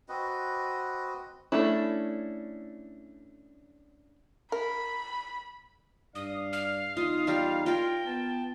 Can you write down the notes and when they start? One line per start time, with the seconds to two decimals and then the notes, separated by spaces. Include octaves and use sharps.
0.09 C4 F#4 B4 D#5
1.52 A3 C#4 D4 E4
4.52 A#4 B5
6.15 G2 D4 D5 F5 D#6
6.53 F6
6.97 E2 D#4 F4 D#6
7.27 G3 F4 A#5
7.66 F4 A#4 G5
8.06 B3 A5